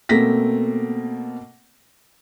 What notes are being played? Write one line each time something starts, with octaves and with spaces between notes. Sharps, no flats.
B2 A3 A#3 C4 A#6 B6